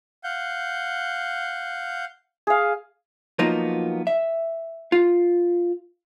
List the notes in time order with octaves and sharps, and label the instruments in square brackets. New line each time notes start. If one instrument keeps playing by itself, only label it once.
[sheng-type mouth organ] F5 F#5 G6
[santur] G#4 F5
[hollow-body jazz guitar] F3 F#3 A#3 B3 D#4 F4
E5
F4